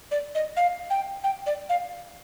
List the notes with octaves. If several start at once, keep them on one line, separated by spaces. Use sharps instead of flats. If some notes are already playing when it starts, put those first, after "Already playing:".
D5
D#5
F5
G5
G5
D5
F5